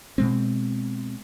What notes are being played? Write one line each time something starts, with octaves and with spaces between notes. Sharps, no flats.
B2 G#3 C4